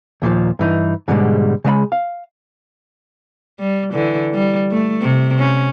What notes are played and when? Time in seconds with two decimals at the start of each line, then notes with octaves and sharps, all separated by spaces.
0.22 D#2 A#2 E3 F3
0.59 G2 E3 D#4
1.08 G#2 B2 D3 F3 G3 G#3
1.64 C#3 G#3 E5 B5
1.92 F5
3.60 G3
3.93 D3 E3
4.34 G3
4.72 A3
5.02 C3
5.39 C#4